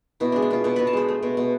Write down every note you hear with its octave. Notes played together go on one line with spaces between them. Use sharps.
B2 E4
G#3 D4
D4
B2 F4
B2 A4
B2 B4
A5
G#3 C5
A3
B2
B2